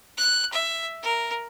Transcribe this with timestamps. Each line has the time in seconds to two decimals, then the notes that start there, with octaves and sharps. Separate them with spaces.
0.18 F#6
0.53 E5
1.03 A#4